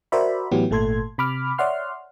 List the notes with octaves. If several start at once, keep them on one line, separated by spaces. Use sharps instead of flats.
F#4 A#4 C5 D5 E5 B5
A2 E3 F#3 B3 E4 G4
G#1 A#2 A3 A4 C6 G#6
C3 B5 D6 F6
C#5 D5 E5 F#5 C6 F6